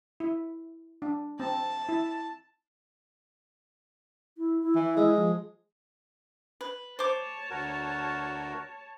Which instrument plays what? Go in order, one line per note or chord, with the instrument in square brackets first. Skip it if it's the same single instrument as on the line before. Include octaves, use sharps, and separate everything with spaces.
[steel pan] E4
D4
[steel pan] C4 [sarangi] A5
[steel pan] E4
[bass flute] E4
E4
[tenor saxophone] E3
G#3
[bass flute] F3
[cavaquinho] B4
[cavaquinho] C5 D6 [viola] C#5 A5
[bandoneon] D2 F#4 A#4